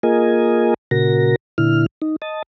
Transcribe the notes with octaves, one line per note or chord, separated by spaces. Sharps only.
A#3 F4 G#4 A#4 D#5 G#5
A#2 C#3 F#4 A#4 A#6
A#2 D3 E4 F6
D#4
D#5 A5